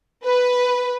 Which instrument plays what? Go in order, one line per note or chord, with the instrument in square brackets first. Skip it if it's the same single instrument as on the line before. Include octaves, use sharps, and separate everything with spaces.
[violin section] B4